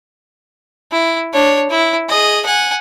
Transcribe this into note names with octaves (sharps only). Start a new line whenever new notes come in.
E4
D4 C#5
E4
G#4 D#5
F#5 G#5